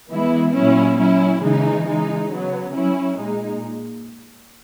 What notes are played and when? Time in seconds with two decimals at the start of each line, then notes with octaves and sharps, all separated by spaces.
0.10 E3 G#3 B3 E4
0.55 A#2 F#3 C#4 E4
0.99 F#3 C#4 E4
1.42 C#3 E3 G#3 D#4
1.87 E3 G#3 D#4
2.30 C#3 F#3 B3
2.75 F#3 C#4 E4
3.19 A#2 G#3 D#4